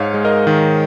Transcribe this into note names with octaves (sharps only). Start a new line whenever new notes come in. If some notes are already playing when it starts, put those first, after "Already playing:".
Already playing: G#2 C#5 F5
G#3
A#4 D#5
D#3